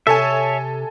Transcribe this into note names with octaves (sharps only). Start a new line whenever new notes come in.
C3 A4 C#5 E5 G#5